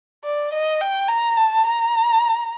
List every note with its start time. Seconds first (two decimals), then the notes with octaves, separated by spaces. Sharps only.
0.24 D5
0.53 D#5
0.81 G5
1.08 A#5
1.37 A5
1.65 A#5